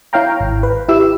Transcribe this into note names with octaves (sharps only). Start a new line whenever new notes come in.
E4 C#5 F5 G5 A#5
G#1
B4
E4 G4 E6